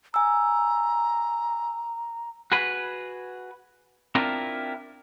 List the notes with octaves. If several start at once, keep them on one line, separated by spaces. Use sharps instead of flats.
G#5 A#5 E6
F#4 G#4 B4
C4 D4 E4 F4 A#4